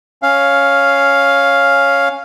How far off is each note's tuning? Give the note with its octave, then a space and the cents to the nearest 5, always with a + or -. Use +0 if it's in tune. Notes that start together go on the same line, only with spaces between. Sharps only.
C#4 +0 F5 +0